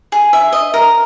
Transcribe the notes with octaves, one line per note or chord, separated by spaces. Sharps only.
G#4
E5
D#5
A#4